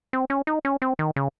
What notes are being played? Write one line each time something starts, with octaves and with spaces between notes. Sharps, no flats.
C4
C#4
D#4
C#4
C4
D#3
C#3